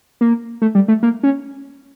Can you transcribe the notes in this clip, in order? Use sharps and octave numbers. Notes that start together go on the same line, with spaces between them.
A#3
A3
G3
A3
A#3
C#4